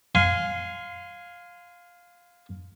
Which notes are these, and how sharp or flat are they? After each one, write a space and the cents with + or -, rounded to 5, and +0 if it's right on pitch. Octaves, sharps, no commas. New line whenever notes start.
F5 +10 G#5 +0 C6 -25